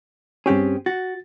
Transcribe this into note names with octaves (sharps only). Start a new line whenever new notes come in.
G2 C4 C#4 G4 G#4
F#4 A6